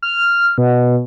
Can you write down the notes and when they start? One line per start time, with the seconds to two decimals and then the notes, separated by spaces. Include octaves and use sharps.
0.02 F6
0.58 B2